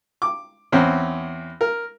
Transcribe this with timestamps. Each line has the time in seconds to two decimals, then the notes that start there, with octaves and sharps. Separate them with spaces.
0.22 D6
0.72 E2 C4 C#4
1.61 A#4